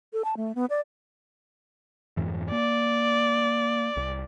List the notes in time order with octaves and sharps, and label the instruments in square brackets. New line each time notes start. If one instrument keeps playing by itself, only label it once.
[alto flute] A4
A5
A3
B3
D5
[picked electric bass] F2 G#2 E3
[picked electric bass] A#3 [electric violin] D5
[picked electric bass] C2